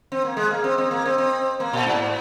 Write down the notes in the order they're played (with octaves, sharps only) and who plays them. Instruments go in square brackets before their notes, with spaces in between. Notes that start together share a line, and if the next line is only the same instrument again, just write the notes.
[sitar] C4
A#3
[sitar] G#3 [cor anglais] D#5
[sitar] A#3 [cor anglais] F5
[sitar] C4 [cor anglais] D#5
[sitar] C4 [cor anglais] D#5
[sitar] A#3
C4
C4
[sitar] A#3 [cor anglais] C5
[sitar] A#2
G#2